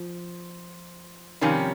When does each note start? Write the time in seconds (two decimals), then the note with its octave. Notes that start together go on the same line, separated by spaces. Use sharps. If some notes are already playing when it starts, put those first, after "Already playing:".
Already playing: F3
1.41 F2 C3 D#3 G3 C#4